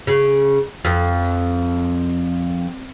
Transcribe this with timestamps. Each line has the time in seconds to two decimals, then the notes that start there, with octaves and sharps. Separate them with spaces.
0.07 C#3
0.85 F2